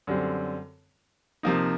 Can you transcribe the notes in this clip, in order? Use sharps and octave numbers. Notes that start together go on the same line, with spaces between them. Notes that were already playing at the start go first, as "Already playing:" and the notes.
F#2 D3 G3 C4
C3 F3 A#3 D#4